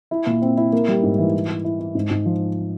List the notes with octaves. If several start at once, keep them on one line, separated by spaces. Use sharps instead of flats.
E4
A#2
C4
E4
A#3
G3
G#2
E3
E4
E4
E4
E4
G#2
G#2
F3